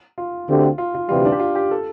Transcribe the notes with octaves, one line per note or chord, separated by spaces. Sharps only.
F4
D2 D3 A3 C4 G4
F4
F4
D2 C3 E3 G3 F4
D4
G4
F4
G4
A4